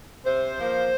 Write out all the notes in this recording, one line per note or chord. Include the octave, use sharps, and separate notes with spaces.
C3 C5
F3 A#3